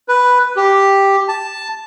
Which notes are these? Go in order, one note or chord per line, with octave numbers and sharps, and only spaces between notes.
B4
G4
A5